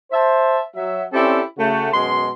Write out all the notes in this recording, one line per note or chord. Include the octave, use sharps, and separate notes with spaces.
C5 E5 A5
F#3 E5
C4 C#4 E4 G4 A4 D5
C#3 A3 F#4
F#2 B2 G#3 C6